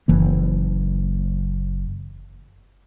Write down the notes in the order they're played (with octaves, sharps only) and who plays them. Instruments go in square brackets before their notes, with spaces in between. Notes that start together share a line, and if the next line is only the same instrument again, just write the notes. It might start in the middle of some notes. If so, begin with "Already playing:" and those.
[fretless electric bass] F#1 E3 A#3